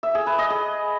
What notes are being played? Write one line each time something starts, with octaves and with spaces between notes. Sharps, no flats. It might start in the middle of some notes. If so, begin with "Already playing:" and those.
E5
G#4
B4
D#5
G#4